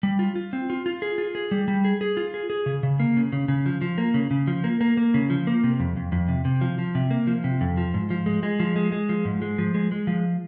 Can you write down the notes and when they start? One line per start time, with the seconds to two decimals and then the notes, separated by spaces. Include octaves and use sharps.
0.03 G3
0.19 F4
0.36 F4
0.53 C4
0.70 F4
0.86 F4
1.02 G#4
1.18 F4
1.35 G#4
1.51 G3
1.68 G3
1.85 G#4
2.01 G#4
2.17 F4
2.34 G#4
2.50 G#4
2.66 C#3
2.83 C#3
3.00 A#3
3.17 C#3
3.33 C#3
3.48 C#3
3.66 F3
3.81 F3
3.98 A#3
4.14 C#3
4.31 C#3
4.47 F3
4.64 A#3
4.81 A#3
4.97 A#3
5.14 C#3
5.30 F3
5.47 A#3
5.64 C3
5.80 F2
5.97 F2
6.12 F2
6.28 C3
6.45 C3
6.61 F3
6.79 F3
6.95 C3
7.11 A#3
7.27 F3
7.44 C3
7.61 F2
7.77 F3
7.94 G#2
8.10 F3
8.26 G#3
8.43 G#3
8.60 F3
8.76 G#3
8.92 G#3
9.09 F3
9.25 G#2
9.42 G#3
9.58 F3
9.74 G#3
9.92 G#3
10.07 F3